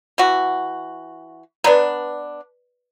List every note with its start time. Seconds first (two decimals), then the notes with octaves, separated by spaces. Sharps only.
0.18 E3 F#4
1.64 B3 D4 B4 D5 A#5